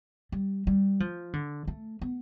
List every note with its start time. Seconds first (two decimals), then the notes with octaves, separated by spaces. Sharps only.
0.32 G3
0.67 G3
1.00 F3
1.33 D3
1.67 A3
2.01 B3